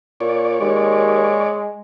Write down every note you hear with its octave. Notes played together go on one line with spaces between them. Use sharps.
A#2 C#5 D5
D#2 G#3